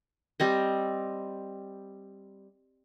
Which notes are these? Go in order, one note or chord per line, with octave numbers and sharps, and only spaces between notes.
G3 C4 D#5